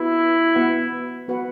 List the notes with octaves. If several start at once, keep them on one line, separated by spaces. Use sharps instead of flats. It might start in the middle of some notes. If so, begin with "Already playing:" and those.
Already playing: B3 E4 F#4 B4
B3 F#4 B4 F#5
B3 F#4 B4 F#5